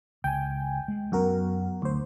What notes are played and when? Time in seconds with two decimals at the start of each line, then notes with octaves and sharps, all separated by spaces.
0.24 C#2 G5 G#5
0.88 G#3
1.12 F#2 F#3 B3 F#4 A#4
1.82 D2 C5